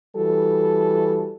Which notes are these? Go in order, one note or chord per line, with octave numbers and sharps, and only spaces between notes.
E3 G3 F#4 A4